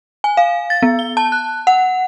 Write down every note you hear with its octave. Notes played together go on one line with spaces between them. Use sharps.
G#5
F5
A6
B3
G7
A5
F#6
F#5